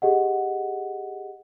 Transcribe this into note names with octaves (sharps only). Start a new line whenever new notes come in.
G4 G#4 D#5 F#5